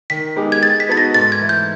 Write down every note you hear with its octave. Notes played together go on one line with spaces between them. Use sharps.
D#3 B6
G#3 B3 D#4 G4
G#6
G#3 A6
B6
B3 D#4 F#4 A4 A6
A#6
G#2 A6
G#6
E3 A3
G6